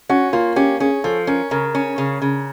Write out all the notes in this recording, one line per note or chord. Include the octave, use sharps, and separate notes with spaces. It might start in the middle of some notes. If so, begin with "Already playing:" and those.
C#4 F#4
A#3 F4
C#4 G4
C#4 G#4
F3 A4
C#4 A#4
C#3 A#4
C#4
C#3
C#3